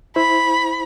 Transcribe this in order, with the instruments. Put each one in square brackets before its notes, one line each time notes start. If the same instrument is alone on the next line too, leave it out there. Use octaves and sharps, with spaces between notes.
[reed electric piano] E4 C5 [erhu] B5